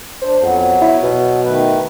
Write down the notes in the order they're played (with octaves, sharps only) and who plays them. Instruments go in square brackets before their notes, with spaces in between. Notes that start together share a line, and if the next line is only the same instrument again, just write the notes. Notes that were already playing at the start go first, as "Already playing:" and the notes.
[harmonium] D4 [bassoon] C5
[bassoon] F2 [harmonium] F#3 B3
[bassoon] E4
B2
[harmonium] D#3 A3 B4